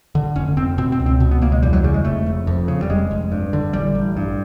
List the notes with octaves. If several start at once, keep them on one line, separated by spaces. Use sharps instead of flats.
D3
F1 C#4
F1 C4
B2 C4
C4
C#2
C4
B2
B3
C#2 A#3
G#3
E2 G3
F#3
C#3 G3
G#3
F1 A3
F1
F2
C#3
G3
F1 G#3
F1
G2
D3
A1 G3
A1
G2